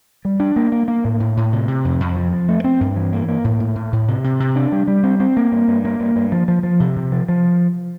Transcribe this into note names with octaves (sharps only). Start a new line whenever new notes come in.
G3
D4
A#3
A#3
A#3
A2
A2
A2
C3
C3
F2
F2
F3
F3
A3
C4
G2
E3
A#3
A#3
A2
A2
A2
A2
C3
C3
C3
D4
G3
G3
C4
C4
A#3
G2
G2
A#3
G2
G2
F3
F3
F3
C3
C3
F3
F3